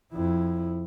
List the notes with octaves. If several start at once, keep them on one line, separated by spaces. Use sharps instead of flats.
F2 E4